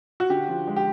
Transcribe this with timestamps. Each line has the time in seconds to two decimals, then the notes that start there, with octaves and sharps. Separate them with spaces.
0.20 F#4
0.30 D3 G4
0.49 F3
0.67 G#3
0.76 G4